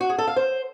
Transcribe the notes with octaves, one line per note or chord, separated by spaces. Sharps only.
F#4
G#4
A4
F5
C5